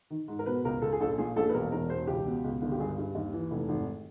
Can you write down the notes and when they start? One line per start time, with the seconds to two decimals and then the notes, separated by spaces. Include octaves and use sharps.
0.10 D#3
0.28 G#2
0.39 A#4
0.46 B2 B4
0.65 C#2 A#4
0.82 C#2 A4
0.92 G#4
1.00 A#1 A4
1.18 A#2 G#4
1.36 A#1 A4
1.49 B4
1.54 E1 A#4
1.72 E2 A#4
1.90 E1 C5
2.07 C#2 G4
2.25 B2
2.44 C#2
2.62 G1
2.72 G4
2.80 G2 G#4
2.98 G2
3.15 D#2
3.33 E3
3.51 F1
3.69 G#1